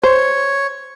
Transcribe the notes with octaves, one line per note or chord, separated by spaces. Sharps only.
C5 C#5